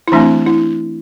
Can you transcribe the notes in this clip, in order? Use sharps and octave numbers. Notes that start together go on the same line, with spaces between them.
E4
E3 A3 C4 D4
E4